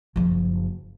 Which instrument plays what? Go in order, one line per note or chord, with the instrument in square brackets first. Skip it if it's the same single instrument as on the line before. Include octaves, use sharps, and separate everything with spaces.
[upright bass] F#1 F3